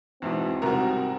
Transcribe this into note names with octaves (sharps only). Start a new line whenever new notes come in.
E2 G#2 B2 C4
C2 G#2 F#4 A#4